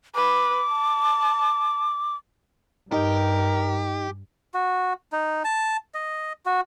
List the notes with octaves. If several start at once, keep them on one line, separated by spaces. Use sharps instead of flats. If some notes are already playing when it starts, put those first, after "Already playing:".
B4 D6
A5
G2 D#4 G4 A#4 D#5
F#4
D#4
A5
D#5
F#4